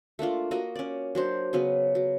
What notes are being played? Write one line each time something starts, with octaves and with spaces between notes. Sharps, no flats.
A3 A#3 D4 F4
A#3 F#4 D#5 A#5
C#4 D5
F#3 D4 C5
C#3 F#3 B3 C#4
F#3